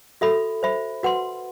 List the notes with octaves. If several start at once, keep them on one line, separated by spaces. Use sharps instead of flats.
F#4 A4 E5 B5
C5 E5 B5
F#4 B4 F#5 C6